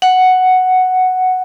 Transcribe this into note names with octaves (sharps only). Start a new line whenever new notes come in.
F#5